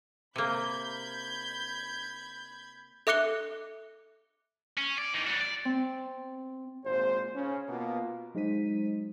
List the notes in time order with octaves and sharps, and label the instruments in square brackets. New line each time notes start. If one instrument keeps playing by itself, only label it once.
[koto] C3 A#3 [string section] B5 G6 G#6
[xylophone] A4 E5 D6 F#6 C#7 G7
[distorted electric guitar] C#4
D5
E3 D#4
G3 F#4
D5
[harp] C4
[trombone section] G#1 A#2 C5
C#3 C#4
B2 A#3 B3 F4
[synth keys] F#3 G#3 D#4 C5 B6 D#7